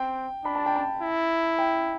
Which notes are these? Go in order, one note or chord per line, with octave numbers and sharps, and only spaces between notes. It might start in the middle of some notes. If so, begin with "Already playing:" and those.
Already playing: C4 G5
D4 B5
A5
G5
A5
E4
G5